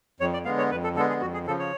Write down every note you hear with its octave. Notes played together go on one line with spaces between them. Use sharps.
F2 C#5
D5
D3 G#3 B3 F5
C#5
F2 B4
A4
D3 G#3 B3 A4
G#4
F2 F#4
G#4
C#3 F3 A4
C#5